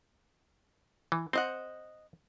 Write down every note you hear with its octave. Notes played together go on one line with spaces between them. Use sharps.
E3
C4 C5 D#5 F#5